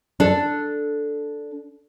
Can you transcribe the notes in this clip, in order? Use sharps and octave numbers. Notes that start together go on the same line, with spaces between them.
D4 A4